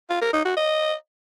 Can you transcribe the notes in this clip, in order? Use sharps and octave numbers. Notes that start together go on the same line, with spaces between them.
F4
A#4
D#4
F#4
D#5